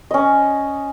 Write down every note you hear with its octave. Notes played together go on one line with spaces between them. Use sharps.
C#4 D#5